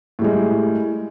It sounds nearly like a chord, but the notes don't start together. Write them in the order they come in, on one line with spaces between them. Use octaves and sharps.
A2 G3 G#3